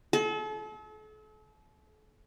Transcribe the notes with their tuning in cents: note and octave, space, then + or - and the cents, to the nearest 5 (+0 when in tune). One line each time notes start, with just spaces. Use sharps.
A4 -40